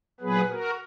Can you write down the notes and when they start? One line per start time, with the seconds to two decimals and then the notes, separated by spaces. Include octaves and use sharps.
0.20 A#2 F#3 B3 G#4 B4
0.50 F#4 A#4